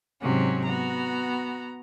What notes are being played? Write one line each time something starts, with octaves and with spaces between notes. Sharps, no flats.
G#2 C3 F#3 C4 C#4 F#4
B3 F#4 A#5